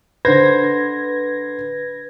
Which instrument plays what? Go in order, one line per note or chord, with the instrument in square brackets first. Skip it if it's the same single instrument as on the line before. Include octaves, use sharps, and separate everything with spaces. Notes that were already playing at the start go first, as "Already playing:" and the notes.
[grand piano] D3 C5 [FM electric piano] B4 G#6 A#6